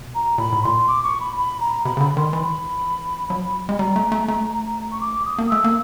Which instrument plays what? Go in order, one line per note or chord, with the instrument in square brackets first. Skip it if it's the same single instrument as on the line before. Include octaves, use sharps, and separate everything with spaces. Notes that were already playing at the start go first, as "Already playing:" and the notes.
Already playing: [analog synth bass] B2
[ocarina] A#5
[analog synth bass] A#2 [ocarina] B5
[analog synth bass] A2
[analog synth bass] A#2 [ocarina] C6
[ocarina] D6
C#6
B5
B5
A#5
[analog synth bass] C3 [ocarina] B5
[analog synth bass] C#3
[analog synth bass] D3 [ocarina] B5
[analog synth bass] D#3 [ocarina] C6
[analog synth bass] E3 [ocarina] B5
[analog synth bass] F#3
G#3
[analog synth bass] G3 [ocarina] A#5
[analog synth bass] A3
A3
[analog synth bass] A3 [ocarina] A#5
[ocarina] A#5
A#5
C#6
D6
D#6
[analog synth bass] A#3
[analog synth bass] A3 [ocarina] E6
[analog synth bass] A#3